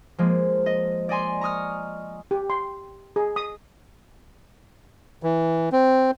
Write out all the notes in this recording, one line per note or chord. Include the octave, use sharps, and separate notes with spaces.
F3 G#3 A#3
D#5
D5 D#5 G#5 C6
A#5 C#6 D#6 F6
G4
C6
G#4
D#6
E3
C4